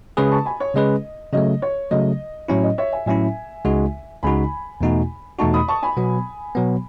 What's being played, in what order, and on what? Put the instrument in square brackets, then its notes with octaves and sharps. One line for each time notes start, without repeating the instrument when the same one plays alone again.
[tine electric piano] C#3 G#3 C#4 G#4 B4 [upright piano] B5 D#6
[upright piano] A5 C#6
G#5 B5
C#5
[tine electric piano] C#3 G#3 C#4 G#4 B4 [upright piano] D#5
[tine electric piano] C#3 F#3 A3 [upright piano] D#5
[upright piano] C#5
[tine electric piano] C#3 F#3 A3 [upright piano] D#5
[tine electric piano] A2 F#3 C#4 E4 [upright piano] C#5
[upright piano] D#5
C#5 E5
E5 G#5
[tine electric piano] A2 F#3 C#4 E4 [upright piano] E5 G#5
[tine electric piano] C#2 C#3 G#3 D#4 F#4
[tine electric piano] C#2 C#3 G#3 D#4 F#4 [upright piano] G#5 B5
[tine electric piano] E2 B2 A3 D#4 F#4
[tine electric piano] E2 B2 A3 D#4 F#4 [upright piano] A5 C#6
[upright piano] B5 D#6
A5 C#6
G#5 B5
[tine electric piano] B2 F#3 B3
B2 F#3 B3